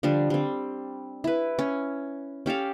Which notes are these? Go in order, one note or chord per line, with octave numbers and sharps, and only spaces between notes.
D3 F3 G3 D4
G3 C4
E4 B4
C#4
C#4 G4 A4 F5